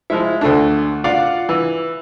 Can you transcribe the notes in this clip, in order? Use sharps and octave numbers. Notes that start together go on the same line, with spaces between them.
F3 G#3 E4
D2 A3 D4
F4 D5 F5 F#5 D6
E3